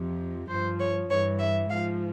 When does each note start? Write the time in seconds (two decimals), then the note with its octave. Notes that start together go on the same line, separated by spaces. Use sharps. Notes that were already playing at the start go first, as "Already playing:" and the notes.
Already playing: F2 C3 F3
0.49 G2 F3 C5
0.80 C#5
1.10 G2 E3 C#5
1.39 E5
1.70 G#2 F3 F5